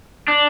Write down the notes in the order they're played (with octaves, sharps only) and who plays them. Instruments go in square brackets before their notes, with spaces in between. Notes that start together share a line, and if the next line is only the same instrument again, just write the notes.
[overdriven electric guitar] D4